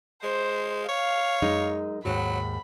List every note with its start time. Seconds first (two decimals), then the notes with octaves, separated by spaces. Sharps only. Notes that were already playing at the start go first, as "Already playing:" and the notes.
0.23 G#3 C5
0.89 C#5 F5
1.42 F#2 G#3 D#4
2.05 D#2 G#2 F#3 F#4 B5